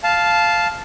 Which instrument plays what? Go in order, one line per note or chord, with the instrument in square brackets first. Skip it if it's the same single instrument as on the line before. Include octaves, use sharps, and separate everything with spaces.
[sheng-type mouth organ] F5 A5